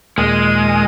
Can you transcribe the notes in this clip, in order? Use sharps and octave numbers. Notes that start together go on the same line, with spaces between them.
D#2 A#2 G#3 D#6